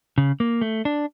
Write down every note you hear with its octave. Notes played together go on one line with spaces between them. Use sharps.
C#3
A#3
A3
D4